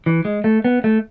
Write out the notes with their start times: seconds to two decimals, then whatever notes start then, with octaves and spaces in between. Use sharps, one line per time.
0.06 E3
0.25 G#3
0.44 A3
0.65 B3
0.84 A3